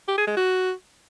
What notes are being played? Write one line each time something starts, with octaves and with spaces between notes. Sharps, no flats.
G4
G#4
G#3
F#4